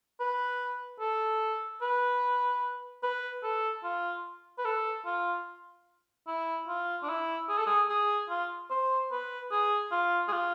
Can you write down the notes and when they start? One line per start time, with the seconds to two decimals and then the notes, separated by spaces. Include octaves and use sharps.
0.20 B4
1.00 A4
1.81 B4
3.03 B4
3.43 A4
3.84 F4
4.58 B4
4.65 A4
5.06 F4
6.27 E4
6.68 F4
7.03 D4
7.08 E4
7.49 G#4
7.58 A4
7.66 G#4
7.89 G#4
8.30 F4
8.70 C5
9.11 B4
9.51 G#4
9.92 F4
10.28 G#4
10.32 F4